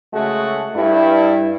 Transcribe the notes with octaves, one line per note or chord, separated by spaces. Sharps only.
C#3 G#3 A3 F#4 G#4 A4
G2 E4